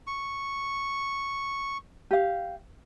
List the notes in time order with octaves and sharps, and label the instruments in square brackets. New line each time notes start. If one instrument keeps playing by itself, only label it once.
[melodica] C#6
[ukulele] G4 F5